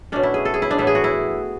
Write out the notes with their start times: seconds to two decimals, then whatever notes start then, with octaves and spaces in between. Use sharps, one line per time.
0.12 B2 A3 C#4 D4
0.23 E4
0.34 G#4
0.45 A4
0.54 G#4
0.62 E4
0.71 D4
0.78 A2 E3 B3 E4
0.87 G#4
0.95 F#4
1.04 E4